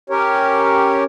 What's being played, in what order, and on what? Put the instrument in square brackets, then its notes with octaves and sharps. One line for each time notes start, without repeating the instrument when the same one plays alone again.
[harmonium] C#4 G4 A#4 C#5